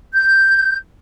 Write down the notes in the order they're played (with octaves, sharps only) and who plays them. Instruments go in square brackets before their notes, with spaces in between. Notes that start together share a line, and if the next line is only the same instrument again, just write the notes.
[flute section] G6